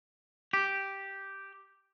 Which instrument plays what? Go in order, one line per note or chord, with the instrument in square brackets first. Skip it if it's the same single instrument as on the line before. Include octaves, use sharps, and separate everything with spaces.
[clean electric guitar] G4